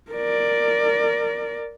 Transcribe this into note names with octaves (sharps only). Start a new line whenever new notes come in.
A#4 D5